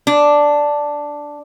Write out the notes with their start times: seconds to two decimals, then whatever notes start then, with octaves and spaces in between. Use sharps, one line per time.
0.07 D4